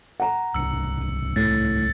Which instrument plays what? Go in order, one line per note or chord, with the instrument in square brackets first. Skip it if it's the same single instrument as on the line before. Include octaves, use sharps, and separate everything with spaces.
[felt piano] F#5 A#5
[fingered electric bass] D1 C2 D4 [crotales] E6 C#7
[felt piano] A2 [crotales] A6